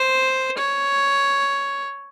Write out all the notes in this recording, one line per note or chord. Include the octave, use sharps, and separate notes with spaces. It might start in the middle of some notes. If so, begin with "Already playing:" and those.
Already playing: C5
C#5